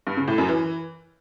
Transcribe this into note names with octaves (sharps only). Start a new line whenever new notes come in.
G2
C#3
A2
F#2
E3